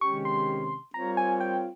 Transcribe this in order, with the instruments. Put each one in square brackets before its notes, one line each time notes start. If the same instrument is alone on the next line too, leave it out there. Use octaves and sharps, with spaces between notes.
[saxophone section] C3 D#3 G#3 C#4 G4 [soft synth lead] C#6
[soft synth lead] C6
[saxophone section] G3 C4 F4 A#4 C#5 [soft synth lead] A#5
[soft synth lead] G#5
G5